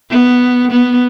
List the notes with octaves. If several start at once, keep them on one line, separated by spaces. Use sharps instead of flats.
B3
B3